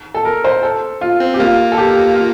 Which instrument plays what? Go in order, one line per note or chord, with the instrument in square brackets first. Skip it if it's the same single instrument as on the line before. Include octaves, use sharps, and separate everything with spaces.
[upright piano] A4
A#4
C5
A4
F4
[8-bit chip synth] C4
[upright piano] G4
[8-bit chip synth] A#3 [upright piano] F4
[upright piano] A4
G4
F4